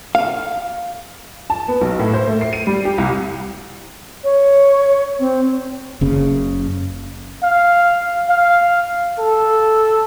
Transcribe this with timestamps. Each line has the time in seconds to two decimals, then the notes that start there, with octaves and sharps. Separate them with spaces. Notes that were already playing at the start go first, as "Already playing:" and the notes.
0.15 F5
1.50 A5
1.68 B3
1.81 B1
1.99 A2
2.14 C5
2.27 A3
2.41 C7
2.53 D#7
2.67 G3
2.85 G4
2.98 C2
4.24 C#5
5.19 C4
6.01 F#1 C#3
7.43 F5
8.29 F5
9.19 A4